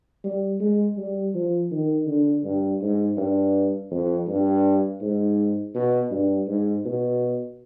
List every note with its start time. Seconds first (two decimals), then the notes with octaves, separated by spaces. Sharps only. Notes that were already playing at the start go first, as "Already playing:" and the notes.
0.24 G3
0.60 G#3
0.97 G3
1.35 F3
1.71 D#3
2.07 D3
2.44 G2
2.82 G#2
3.17 G2
3.91 F2
4.27 G2
5.02 G#2
5.75 B2
6.11 G2
6.48 G#2
6.85 B2